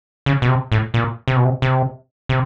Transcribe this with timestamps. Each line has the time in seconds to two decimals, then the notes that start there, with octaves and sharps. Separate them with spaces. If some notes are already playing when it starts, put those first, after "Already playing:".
0.26 C#3
0.42 B2
0.49 C3
0.72 A2
0.94 A#2
1.28 C3
1.36 B2
1.45 C3
1.62 C3
2.29 C3